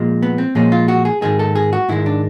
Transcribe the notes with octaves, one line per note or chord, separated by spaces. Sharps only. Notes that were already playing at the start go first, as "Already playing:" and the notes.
Already playing: A#2 F3 G#3
B3
C4
A#2 F3 G#3 C#4
F4
F#4
G#4
G#2 D#3 G#3 G#4
A4
G#4
F#4
G#2 D#3 G#3 E4
D4